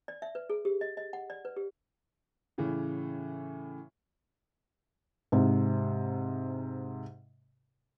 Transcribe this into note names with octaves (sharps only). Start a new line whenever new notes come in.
D5
E5
B4
G#4
G4
D#5
D#5
F#5
D5
B4
G4
A2 C#3 E3
G#2 C3